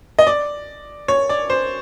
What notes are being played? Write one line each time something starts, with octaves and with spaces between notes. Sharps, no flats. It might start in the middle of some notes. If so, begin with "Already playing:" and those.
D#5
D5
C#5
D5
C5